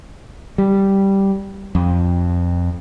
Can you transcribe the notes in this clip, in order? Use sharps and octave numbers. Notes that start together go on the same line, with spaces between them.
G3
F2